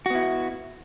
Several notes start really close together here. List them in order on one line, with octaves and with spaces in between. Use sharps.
F#4 B3 E4